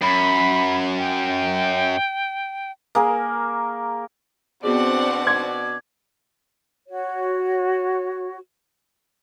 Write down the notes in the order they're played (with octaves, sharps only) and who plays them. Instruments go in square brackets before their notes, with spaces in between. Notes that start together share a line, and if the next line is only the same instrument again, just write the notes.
[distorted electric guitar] F#2 [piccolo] B5
[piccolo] G5
[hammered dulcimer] A#3 G#4 A#4
[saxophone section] B2 D5 [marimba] B3 F#4 G#4 [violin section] C4 D4 F#5
[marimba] C6 D6 [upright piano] G#6
[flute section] F#4 C#5